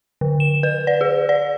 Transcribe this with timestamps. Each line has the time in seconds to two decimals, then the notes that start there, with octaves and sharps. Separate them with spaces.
0.21 D3
0.40 E7
0.63 B4
0.87 D5
1.01 G#4
1.29 D5